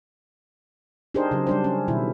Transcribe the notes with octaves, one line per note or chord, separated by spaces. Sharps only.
D4 D#4 G4 G#4 A#4 C5
C#3 F#3
G3 D4 C5
C#4
B2 D#3 E4